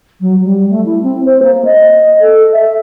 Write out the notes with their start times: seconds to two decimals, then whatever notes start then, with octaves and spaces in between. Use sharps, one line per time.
0.20 F#3
0.44 G3
0.69 A3
0.85 E4
1.03 C4
1.25 C5
1.42 A#3
1.64 D#5
2.20 A4
2.52 E5